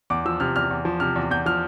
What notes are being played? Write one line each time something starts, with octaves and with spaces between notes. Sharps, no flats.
E2 D6
F3 E6
C3 F6
E2 F6
E2
F3
C3 F6
E2
E2 G6
F3 F6